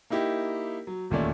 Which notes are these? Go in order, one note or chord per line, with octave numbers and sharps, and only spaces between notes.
A#3 D#4 E4 G4
F#3
E1 D#2 A#2 A3 C#4 D5